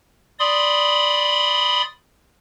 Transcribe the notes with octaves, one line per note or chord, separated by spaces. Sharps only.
D5 B5 C6 D#6